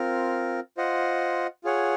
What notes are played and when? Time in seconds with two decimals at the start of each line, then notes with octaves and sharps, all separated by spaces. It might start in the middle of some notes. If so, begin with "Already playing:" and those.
Already playing: C4 F4 A#4
0.77 F4 C5 D#5 F#5
1.64 F4 G#4 C#5 F#5